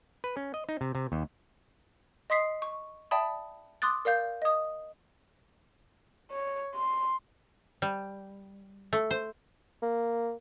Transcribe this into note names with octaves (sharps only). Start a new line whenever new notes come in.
B4
C#4
D#5
D#4
C3
C3
D#2
D#5 C6 D#6 B6 C7
C#6
D5 E5 G5 A5 B5 D#6
C6 D6 D#6 F#6 A6
A#4 D5 F5 G6
D#5 D#6
C#5
C6
G3
A3
C5
A#3